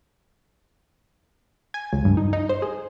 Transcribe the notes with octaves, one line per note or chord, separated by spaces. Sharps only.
G#5
C#2
G2
D#4
D#4
C5
G#4